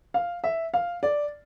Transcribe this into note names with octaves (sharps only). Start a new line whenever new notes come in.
F5
E5
F5
D5